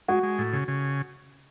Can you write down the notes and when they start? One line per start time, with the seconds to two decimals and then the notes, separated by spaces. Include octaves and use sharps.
0.08 G#3 F#4
0.23 G#3
0.38 A2
0.53 C#3
0.68 C#3